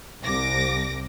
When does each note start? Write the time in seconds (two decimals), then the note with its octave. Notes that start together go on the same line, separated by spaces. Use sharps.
0.24 C2 D6 A#6